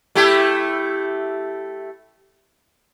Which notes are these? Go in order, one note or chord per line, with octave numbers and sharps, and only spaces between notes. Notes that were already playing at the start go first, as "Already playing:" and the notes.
A3 E4 G4